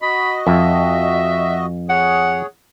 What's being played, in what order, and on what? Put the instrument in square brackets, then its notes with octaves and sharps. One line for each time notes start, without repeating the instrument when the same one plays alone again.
[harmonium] F#4 D#5 [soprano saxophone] B5
[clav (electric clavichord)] F2 [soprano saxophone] E5
[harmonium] G#4 C#5 [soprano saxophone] F#5